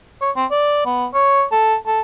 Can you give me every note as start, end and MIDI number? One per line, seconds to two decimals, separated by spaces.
0.21 0.31 73
0.36 0.46 60
0.51 0.83 74
0.86 1.06 59
1.14 1.44 73
1.52 1.76 69
1.87 2.01 69